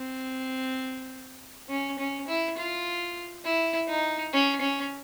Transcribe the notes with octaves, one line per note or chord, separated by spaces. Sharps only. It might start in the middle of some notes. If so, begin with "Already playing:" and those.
Already playing: C4
C#4
C#4
E4
F4
E4
D#4
C#4
C#4